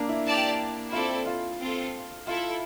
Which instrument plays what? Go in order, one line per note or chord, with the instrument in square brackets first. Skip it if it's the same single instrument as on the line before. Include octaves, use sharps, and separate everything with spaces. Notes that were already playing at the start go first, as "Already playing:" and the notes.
Already playing: [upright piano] A#3 D4
E4
[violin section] G4 D5 A5
[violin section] C4 E4 A4 D5 [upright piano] F4
[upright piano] F4
[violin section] C4 F4 A4
[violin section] E4 A4 E5 [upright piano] F4